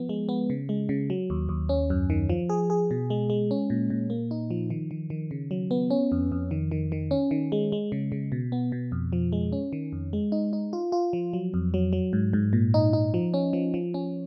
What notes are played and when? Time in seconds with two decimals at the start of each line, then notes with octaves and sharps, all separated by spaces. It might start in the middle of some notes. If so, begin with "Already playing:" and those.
Already playing: F3 B3
0.09 G#3
0.29 B3
0.50 C#3
0.69 G#3
0.89 C#3
1.10 F#3
1.30 D#2
1.49 D#2
1.69 C#4
1.90 F#2
2.10 D#3
2.29 F3
2.50 G#4
2.70 G#4
2.91 B2
3.10 G#3
3.30 G#3
3.51 C#4
3.70 A#2
3.90 A#2
4.10 A#3
4.31 D#4
4.51 F3
4.70 D#3
4.91 D#3
5.10 D#3
5.31 C#3
5.51 F#3
5.71 B3
5.90 C#4
6.12 F2
6.32 F2
6.51 D#3
6.71 D#3
6.92 D#3
7.11 C#4
7.31 D#3
7.52 G#3
7.72 G#3
7.92 C#3
8.12 C#3
8.32 B2
8.52 B3
8.72 B2
8.92 F2
9.13 F3
9.32 G#3
9.52 C#4
9.73 D#3
9.92 F2
10.13 G#3
10.32 D#4
10.53 D#4
10.73 F4
10.92 F4
11.13 F3
11.33 F#3
11.54 F2
11.74 F#3
11.93 F#3
12.13 G#2
12.33 G#2
12.53 A#2
12.74 D#4
12.93 D#4
13.14 F3
13.34 C#4
13.53 F3
13.74 F3
13.94 C#4